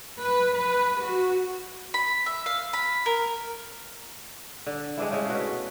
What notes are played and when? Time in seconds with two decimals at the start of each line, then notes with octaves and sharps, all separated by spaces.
0.19 B4
0.55 B4
1.00 F#4
1.94 B5
2.26 E5
2.46 F5
2.73 B5
3.06 A#4
4.66 D3
4.97 G#3 C4 D4 E4
5.11 C#3 G#3 A3
5.29 B2 C#4 F#4 B4